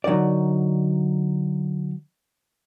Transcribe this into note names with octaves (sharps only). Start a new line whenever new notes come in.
D3 F#3 D#4 A#4 D5